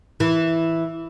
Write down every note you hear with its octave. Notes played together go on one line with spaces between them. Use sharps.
E3